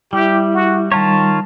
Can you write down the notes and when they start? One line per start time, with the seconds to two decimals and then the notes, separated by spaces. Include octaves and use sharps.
0.13 G3 E4 G4 E5
0.54 F#4
0.92 D#3 G3 F4 C#5 A5